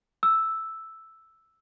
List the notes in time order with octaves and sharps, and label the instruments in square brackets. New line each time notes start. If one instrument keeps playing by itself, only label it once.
[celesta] E6